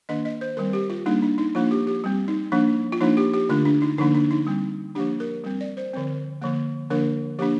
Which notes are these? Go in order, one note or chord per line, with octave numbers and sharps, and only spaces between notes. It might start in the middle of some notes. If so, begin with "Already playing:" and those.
D#3 A#3 D4 D#5
D#5
C5
D#3 G3 C4 A#4
G4
F4
G3 A#3 D4 D#4
D4
D#4
F3 A#3 D4 F4
G4
G4
G3 C4
D#4
F3 A#3 D4
F4
F3 A#3 D4 D#4
G4
G4
D3 A3 D4 F4
D4
D#4
D3 F3 A#3 D4 D#4
D4
D#4
G3 C4
F3 A#3 D4 G4
A#4
G3 C4
D5
C5
D3 F3 C4
D3 F3 A#3
D3 F3 A#3 D4 A#4
F3 A#3 D4 G4